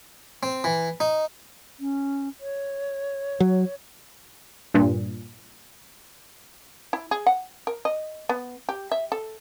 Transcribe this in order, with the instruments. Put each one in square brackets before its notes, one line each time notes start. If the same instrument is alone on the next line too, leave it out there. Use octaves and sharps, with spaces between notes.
[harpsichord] C4
E3
D#4
[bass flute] C#4
C#5
[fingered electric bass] F#3
[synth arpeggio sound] G2 A#2
[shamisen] E4
G#4
F#5
A#4
D#5
B3
G4
E5
A4